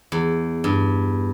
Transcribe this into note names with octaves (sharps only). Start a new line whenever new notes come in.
E2
G2